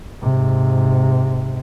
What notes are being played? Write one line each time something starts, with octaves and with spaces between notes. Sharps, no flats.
G#2 C3